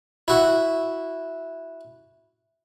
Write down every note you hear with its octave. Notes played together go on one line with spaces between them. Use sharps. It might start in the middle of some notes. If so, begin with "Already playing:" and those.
E4 F#4